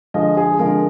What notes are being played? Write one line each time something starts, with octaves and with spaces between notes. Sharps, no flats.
D3 F3 G#3 D#5
G#4
D3 F3 G#3 A#4